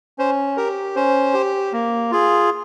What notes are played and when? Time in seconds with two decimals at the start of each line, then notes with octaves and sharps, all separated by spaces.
0.18 C#4 C5
0.57 G4 A#4
0.96 C#4 C5
1.34 G4
1.73 A#3
2.11 F4 G#4